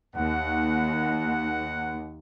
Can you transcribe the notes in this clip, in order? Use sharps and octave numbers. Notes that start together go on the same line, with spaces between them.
D#2 F#5